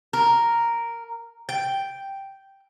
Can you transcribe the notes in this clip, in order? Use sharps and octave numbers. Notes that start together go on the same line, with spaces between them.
A#4
G5